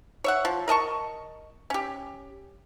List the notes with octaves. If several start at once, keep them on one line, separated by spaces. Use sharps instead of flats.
C#5 E5 F#5
F3
A#4 D#5 A5 C#6
C#4 G4